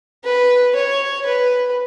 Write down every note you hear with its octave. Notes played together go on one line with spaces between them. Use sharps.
B4
C#5
B4